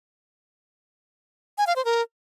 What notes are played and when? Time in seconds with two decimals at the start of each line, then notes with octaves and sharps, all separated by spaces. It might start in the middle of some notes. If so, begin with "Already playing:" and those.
1.58 G#5
1.67 F5
1.76 C5
1.85 A#4